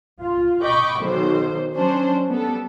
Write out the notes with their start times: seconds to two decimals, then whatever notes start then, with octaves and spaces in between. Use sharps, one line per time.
0.21 F4
0.62 D#5 G5 B5 C#6 D6
1.00 B1 D#3 C5
1.75 F#3 C#4 D4 C5
2.29 G3 B3 A4